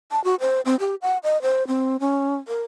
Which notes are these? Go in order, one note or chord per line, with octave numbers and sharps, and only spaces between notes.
A5
F#4
C5
C4
G4
F#5
D#5
C5
C4
C#4
A#4